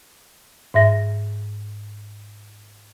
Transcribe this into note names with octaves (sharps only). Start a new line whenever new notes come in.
G#2 E5 A#6